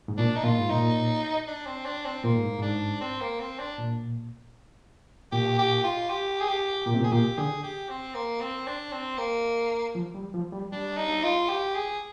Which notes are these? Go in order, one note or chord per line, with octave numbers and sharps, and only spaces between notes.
G#2
A#2 D4
D#4
A#2 F4
G#2
A#2 D#4
D4
C4
D4
C4
A#2 A#3
G#2
G#2 D4
C4
A#3
C4
D4
A#2
A#2 G4
G4
F4
G4
G#4
G4
A#2 G4
C3
A#2
G#4
A#2 G4
D3 G#4
G4
C4
A#3
C4
D4
C4
A#3
F3
G3
F3
G3
G3 D4
D#4
F4
G4
G#4